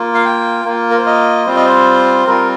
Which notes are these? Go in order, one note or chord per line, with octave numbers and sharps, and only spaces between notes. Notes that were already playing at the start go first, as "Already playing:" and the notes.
Already playing: A#3 F4
F5
G5
A#3 F4
A#4
C5
D#5
G3 C4 F4 C5
D#5
C5
G3 C4 F4 A#4